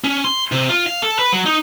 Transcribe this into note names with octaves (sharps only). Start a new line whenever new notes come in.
C#4
C6
C3
F4
F5
A4
B4
F#3
D#4